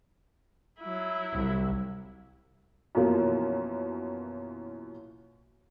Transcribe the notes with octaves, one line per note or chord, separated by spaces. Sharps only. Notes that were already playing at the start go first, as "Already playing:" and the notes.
F#3 E4
C2
F#2 B2 E3 F3 A#3